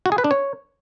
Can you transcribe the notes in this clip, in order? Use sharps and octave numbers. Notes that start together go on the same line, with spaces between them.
F#4
G#4
B4
D4
C#5